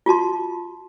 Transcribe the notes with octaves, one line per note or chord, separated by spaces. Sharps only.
F4 F#4 A5 C6